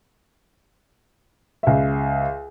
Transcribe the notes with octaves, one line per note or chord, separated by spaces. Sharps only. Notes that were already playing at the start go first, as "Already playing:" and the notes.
C#2 E5